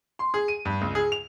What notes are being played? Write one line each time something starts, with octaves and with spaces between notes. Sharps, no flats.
C6
G#4
D#7
G2
C#2
G#4
F7